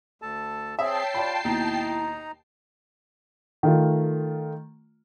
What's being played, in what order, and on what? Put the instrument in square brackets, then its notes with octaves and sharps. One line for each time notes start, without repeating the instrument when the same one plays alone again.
[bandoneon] D2 A4 A5
[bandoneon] C4 G#4 [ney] C#5 [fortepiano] E5 [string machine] G5 A5 C7
[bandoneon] F4 [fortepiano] D5 B5
[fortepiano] D#2 B2 [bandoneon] D#4 A#5 [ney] E4
[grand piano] D#3 A3 F4